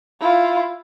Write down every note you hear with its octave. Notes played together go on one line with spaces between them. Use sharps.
E4 F4